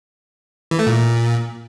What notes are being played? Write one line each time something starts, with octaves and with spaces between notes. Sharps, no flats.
E3
A3
A#2